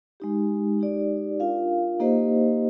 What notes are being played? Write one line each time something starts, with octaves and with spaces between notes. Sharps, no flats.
G#3 D#4 G4
D#4 G4 D5
D4 F4 A#4 F5
A#3 D#4 G4 C5 D#5